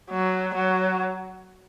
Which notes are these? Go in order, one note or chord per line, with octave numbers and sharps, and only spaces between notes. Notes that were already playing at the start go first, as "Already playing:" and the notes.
F#3
F#3